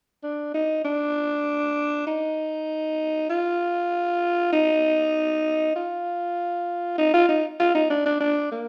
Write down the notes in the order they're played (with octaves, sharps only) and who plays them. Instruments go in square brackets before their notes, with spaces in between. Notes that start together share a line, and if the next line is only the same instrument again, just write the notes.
[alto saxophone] D4
D#4
D4
D#4
F4
D#4
F4
D#4
F4
D#4
F4
D#4
D4
D4
D4
A#3